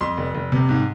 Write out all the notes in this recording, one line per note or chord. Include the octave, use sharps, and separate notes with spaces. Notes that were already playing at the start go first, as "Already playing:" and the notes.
F2 C6
F1
F1
C3
G#2